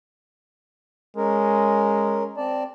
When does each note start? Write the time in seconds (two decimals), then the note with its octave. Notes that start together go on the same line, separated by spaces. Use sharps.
1.17 G#3 C#4 A#4
2.37 C4 D5 A5